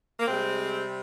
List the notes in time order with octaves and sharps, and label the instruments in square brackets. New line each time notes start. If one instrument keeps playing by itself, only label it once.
[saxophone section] A#3
C3 G3 G#3 C4